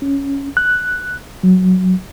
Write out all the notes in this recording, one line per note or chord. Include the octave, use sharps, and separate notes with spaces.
C#4
F#6
F#3